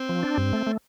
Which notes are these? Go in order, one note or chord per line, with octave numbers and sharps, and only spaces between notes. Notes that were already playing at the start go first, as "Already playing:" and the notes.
Already playing: C4
F3
D4
G2
A3
A3